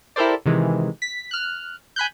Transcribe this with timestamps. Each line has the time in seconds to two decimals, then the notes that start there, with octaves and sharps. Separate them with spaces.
0.16 E4 G4 A4 A#4 C5 D5
0.46 C3 D#3 E3 G#3
1.02 B6
1.31 F6 F#6
1.96 G#5 B5 F#6 G6